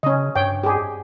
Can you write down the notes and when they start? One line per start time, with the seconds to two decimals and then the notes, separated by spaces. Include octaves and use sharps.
0.03 C#3 C#4 D#5
0.35 G2 C#5 G5
0.64 G4 G#4